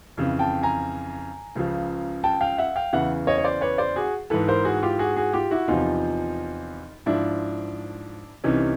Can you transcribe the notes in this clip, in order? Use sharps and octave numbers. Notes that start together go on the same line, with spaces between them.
F2 C#3 E3
G5 A5
G#5 A#5
C#2 C#3 F3
G5 A5
F5 G5
E5 F#5
F5 G5
E2 C#3 E3 E5 F#5
C#5 D#5
C#5
C5 D5
B4 C#5
C5 D5
F#4 G#4
G#2 E3 A4 B4
A#4 C5
F#4 G#4
F4 G4
F#4 G#4
F#4 G#4
F4 G4
E4 F#4
E2 C3 F3 D#4 F4
G#2 F3 D4 E4
C2 C3 E3 C#4 D#4